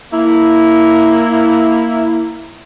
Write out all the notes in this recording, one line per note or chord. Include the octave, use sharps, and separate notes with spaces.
A#3 E4